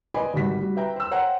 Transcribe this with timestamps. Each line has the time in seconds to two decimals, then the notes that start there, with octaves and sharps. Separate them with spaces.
0.14 B4 C5 D5 D#5 G#5 B5
0.34 G#1 G3 F#4 B6
0.61 G3 F#4
0.76 B4 E5 G5 A#5
0.96 C5 E6
1.11 C5 C#5 F#5 G5 A#5